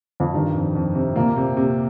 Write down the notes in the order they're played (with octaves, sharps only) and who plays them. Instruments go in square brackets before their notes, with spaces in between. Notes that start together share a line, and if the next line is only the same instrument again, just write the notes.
[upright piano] F2
[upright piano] G2 [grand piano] D#3
[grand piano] F2
F2
C3
[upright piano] A#2 [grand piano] A#3
[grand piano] C3
C3